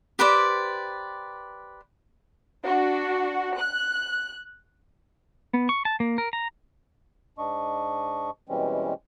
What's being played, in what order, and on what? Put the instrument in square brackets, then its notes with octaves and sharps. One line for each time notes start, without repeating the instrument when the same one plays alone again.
[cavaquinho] G4 B4 C5 D5
[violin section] D4 F#4
F#6
[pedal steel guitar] B3
C#6
A5
A#3
A#4
A#5
[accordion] G#2 D4 D#5 C#6
B2 E3 G3 G#3 C4 C#4